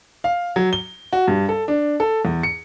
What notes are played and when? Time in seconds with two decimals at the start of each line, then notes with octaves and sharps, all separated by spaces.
0.24 F5
0.56 F#3
0.73 G7
1.13 F#4
1.28 G2
1.49 A4
1.68 D4
2.00 A4
2.25 E2
2.43 C#7